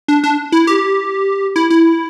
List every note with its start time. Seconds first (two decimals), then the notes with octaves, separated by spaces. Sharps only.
0.08 D4
0.24 D4
0.52 E4
0.67 G4
1.56 E4
1.70 E4